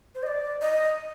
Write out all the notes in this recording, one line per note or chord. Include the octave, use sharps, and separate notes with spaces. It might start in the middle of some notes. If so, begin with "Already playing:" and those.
C5
D#5
D5
D#5